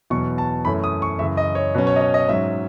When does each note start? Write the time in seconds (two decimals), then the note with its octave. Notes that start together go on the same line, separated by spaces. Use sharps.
0.10 E2 B2 F#3 C#6
0.38 A5
0.65 F#2 E3 A3 C#4 B5
0.84 D#6
1.02 C#6
1.19 F#2 C#3 E3 E5
1.37 D#5
1.55 C#5
1.75 B2 F#3 C#4 B4
1.87 C#5
1.96 D#5
2.01 C#5
2.14 D#5
2.28 G#2 F#3 C#4 E5